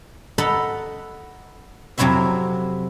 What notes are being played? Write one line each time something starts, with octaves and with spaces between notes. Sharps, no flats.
A4 D#5 F#5 A#5 B5
F2 C3 F#3 E4 F#4 E5